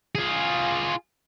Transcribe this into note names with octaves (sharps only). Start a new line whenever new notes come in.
F4 G#4